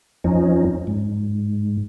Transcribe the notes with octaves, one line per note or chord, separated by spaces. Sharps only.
F2 F3 C#4 D#4
G#2